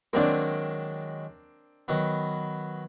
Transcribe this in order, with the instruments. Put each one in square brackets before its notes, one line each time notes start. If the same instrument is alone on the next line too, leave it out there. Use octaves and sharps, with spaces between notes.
[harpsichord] D#3 F#3 G#3 [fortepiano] A#3 C4 D4
[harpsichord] D#3 F#3 B3